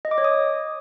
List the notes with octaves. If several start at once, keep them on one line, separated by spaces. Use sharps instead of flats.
D#5
D6
C#5
D#6